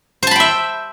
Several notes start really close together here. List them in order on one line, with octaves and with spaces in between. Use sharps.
C5 A5 B5 G5 E5